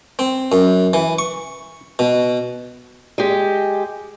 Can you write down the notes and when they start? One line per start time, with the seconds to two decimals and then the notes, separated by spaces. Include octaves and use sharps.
0.19 C4
0.52 F#2
0.93 E3
1.19 C#6
1.99 B2
3.18 G#3 G4